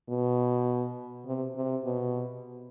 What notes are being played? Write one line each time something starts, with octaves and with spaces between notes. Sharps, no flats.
B2
C3
C3
B2